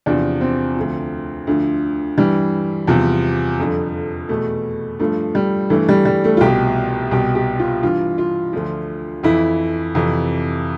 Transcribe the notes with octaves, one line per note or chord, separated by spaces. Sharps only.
E2 C3 F3 D4
C4
D2 D3 F3
D2 D3 F3
G2 E3 G3
E2 C3 F3
F2 D3 F3
E2 B2 A3
G2 F3 A3
G3
G2 E3 A3
G3
G3
A3
F4
C2 B2 G4
C2 B2 G4
G4
F4
G2 E3 F4
F4
D2 D3 F3
F2 E3 E4
F2 C3 E3